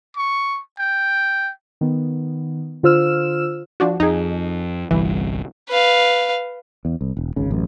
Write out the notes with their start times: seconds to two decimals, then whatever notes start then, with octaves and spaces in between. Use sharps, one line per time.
0.17 C#6
0.79 G5
1.81 D#3 B3
2.83 D3 F4 C5 E6 F6 E7
3.80 F3 D4 F#4
4.00 F2 D#4 G#4
4.91 G1 C2 E3 G3
5.69 B4 F5
6.85 E2
7.01 C2
7.17 E1
7.36 G#1 C#2 C#3
7.51 A1 F#2